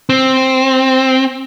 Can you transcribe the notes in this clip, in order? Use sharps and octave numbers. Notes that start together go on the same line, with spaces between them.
C4